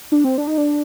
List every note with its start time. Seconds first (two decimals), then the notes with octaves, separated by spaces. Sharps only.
0.12 D4
0.24 C4
0.38 D4
0.47 D#4
0.58 D4